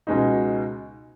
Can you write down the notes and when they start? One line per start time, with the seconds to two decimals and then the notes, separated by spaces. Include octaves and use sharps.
0.07 C#2 B2 G#3 D#4